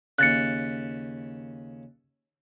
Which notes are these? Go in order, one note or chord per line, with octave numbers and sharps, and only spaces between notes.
D#2 C#3 F#6 A6 C#7